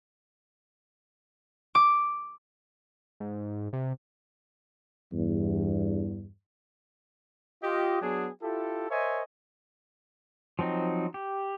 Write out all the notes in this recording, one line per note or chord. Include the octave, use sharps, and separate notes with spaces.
D6
G#2
C3
E2 G2
F4 G4 D#5
F#3 B3 D4 G#4
E4 F4 G4 A4
A#4 C5 C#5 D#5 E5 G#5
F3 F#3 C4 D#4
G4